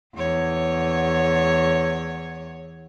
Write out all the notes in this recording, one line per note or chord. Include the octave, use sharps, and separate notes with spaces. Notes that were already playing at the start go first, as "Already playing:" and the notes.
E2 C#5